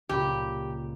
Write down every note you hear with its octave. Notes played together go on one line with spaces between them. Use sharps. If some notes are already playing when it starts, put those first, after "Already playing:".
C#2 A#2 G4 B5